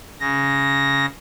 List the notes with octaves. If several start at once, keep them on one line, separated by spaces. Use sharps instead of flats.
C#3 A#6